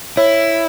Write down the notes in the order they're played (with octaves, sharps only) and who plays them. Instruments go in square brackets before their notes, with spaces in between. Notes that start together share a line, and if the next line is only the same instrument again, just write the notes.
[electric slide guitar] E4 [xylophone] C#5